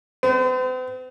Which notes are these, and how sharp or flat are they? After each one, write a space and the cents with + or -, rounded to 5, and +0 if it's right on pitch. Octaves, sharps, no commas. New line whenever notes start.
C4 -45 C5 -30